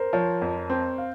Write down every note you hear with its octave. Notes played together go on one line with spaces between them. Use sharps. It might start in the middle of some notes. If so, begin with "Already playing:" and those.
Already playing: A#4 C5
F3 C#5
F2
C4
F5